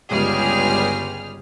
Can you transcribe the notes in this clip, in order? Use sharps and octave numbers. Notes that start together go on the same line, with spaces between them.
G1 C#2 G3 G#3 G#4 F6